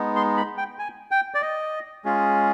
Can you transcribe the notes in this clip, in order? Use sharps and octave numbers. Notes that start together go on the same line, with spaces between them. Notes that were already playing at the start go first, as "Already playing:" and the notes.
Already playing: G#3 B3 D#4
C6
B5
G5
G#5
G5
D5
D#5
G#3 C#4 F4 G#4